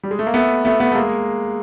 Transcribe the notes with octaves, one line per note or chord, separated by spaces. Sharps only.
G3
G#3
A3
A#3
A3 B3
A3 B3
A3 B3
A3
G#3 A#3